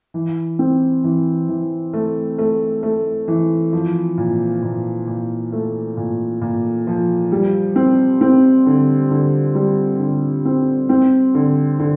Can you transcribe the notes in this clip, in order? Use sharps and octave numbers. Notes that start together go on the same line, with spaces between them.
E3
C4
E3
E3
A3
A3
A3
E3
F3
A#2
A#2
A#2
A3
A#2
A#2
F3
G3
C4
C4
D3
D3
G3
D3
C4
C4
D3
D3